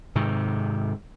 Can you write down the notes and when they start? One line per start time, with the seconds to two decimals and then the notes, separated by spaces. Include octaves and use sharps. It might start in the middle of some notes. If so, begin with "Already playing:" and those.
0.15 G#2 C3 D#3